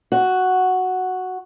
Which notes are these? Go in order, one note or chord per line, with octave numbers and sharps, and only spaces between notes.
F#4